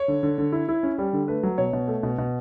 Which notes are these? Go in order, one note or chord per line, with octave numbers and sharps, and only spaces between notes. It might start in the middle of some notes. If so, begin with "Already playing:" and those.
Already playing: C#5
D3
D3
D3
E4
E4
C#4
G3
D3
A3 B4
F#3
B2 C#5
B2
A3
B2
B2